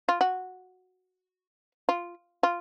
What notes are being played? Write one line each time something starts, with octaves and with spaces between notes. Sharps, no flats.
F4
F#4
F4
F4